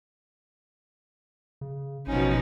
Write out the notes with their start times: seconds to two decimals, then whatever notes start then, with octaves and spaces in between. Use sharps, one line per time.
1.61 C#3
2.07 A1 B2 F3 C#4 D#4